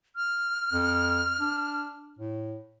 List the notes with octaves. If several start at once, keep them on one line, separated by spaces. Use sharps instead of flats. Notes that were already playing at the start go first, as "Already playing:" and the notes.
F6
F2
D4
A2